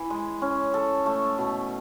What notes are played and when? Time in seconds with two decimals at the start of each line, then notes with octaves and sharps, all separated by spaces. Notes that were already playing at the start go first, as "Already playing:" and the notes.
Already playing: E3
0.10 G#3
0.42 C#4
0.74 A4
1.06 A3
1.38 B2